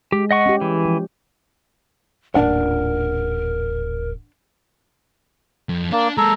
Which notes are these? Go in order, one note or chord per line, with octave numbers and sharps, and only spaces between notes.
G#3 G4
D#5 F#5 C#6
C#4 G4
E3
F3
D#1 A1 D4 A#4 F#5
F2
A#3 D4
G#3 A#3 A4 A#5